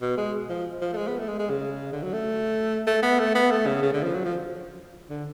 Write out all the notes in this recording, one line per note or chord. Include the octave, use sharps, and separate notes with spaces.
B2
G#3
F3
F3
A3
G#3
B3
A3
G#3
G#3
C#3
D3
F#3
A3
A3
B3
A3
B3
A3
C#3
C#3
D3
F3
F#3
F3
D3